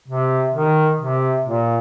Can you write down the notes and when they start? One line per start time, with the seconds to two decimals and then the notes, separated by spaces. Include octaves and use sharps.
0.08 C3
0.54 D#3
0.99 C3
1.46 A#2